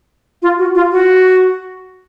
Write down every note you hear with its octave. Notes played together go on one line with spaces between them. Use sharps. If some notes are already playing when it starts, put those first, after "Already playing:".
F4
F#4
F4
F#4